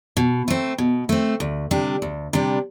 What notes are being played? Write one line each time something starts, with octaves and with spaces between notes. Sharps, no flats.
B2
A3 C4
B2
A3 C4
D2
C3 G3 D4
D2
C3 G3 D4